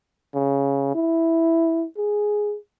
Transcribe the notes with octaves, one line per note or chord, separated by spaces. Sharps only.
C#3
E4
G#4